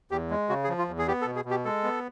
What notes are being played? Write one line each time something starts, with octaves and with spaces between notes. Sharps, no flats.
E2 G4
G#3
C#3 F#4
G#4
F3
F4
E2
G#4
B3 G4
A4
B2
G#4
B2
G4
G#3 A4
B3